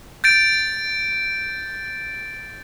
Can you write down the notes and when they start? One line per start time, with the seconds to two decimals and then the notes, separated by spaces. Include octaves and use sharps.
0.24 G6 A6 D7